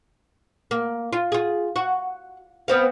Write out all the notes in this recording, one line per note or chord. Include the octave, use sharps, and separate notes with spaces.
A#3
F4
F4 G#4
F#4
B3 C4 F5